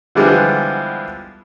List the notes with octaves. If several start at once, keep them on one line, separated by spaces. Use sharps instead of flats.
D3 E3 F3 G3 G#3 B3